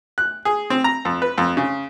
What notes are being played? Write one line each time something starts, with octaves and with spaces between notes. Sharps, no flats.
F#6
G#4
C4
A#5
F2
B4
F2
C#3